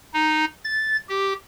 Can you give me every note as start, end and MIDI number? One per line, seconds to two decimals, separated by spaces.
0.14 0.45 63
0.64 0.97 93
1.09 1.33 67